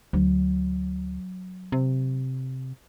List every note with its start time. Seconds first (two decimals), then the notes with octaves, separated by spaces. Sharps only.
0.13 D2 F#3
1.72 C3